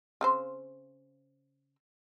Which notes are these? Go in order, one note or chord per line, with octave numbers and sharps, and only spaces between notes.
C#3 C4 C5